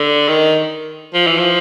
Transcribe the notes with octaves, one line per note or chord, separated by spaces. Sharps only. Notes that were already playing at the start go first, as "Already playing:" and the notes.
Already playing: D3
D#3
F3
E3
F3